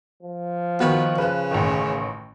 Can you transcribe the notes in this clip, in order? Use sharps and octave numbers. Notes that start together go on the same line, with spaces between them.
F3
D#3 B3 F#4
C#3 B4 F#6
A1 D#3